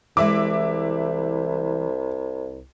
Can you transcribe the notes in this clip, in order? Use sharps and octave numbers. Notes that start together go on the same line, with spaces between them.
C2 E3 G#3 E5 D6